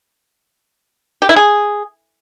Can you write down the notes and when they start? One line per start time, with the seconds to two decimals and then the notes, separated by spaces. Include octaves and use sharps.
1.22 G4
1.29 E4
1.36 G#4